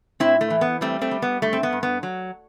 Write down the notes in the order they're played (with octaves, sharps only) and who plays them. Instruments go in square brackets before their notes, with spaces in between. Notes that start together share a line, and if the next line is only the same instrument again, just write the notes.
[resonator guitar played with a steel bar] A2 C4 E4
A3
E3
B3
G3 A3 C4
A3 C4
G3
B3
G2 A3
C4
B3
G2
B3
F#3